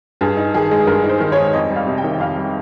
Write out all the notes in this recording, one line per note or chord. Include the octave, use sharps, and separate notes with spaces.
G2 G#4
D#4
D#3 G#4
G#3
G2 A#4
D#4
C5
D#3
C#5
G#3
F2 D#5
G3
F5
C3
G5
D#3
F2 F5
G3